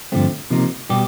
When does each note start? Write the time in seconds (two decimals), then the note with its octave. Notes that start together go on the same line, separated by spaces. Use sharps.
0.12 G2 D3 F3 A3 C4
0.50 C3 F3 A#3 D#4
0.90 B2 G3 B3 G4